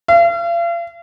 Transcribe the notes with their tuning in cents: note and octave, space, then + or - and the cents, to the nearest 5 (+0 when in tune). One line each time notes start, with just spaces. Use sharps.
F5 -40